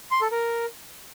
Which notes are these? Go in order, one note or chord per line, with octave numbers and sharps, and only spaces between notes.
C6
A4
A#4